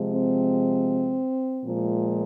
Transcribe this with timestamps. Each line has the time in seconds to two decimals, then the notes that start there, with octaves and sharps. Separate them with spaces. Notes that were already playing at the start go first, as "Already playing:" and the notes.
Already playing: C3 F3 G#3
0.11 C4
1.64 A#2 F3 G#3